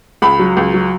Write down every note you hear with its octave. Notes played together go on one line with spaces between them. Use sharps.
C#2 B5
F#3
C#2
F#3